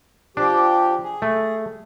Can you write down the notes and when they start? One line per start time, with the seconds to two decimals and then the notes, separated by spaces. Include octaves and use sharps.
0.37 F3 D4 G4
1.03 G#4
1.22 A3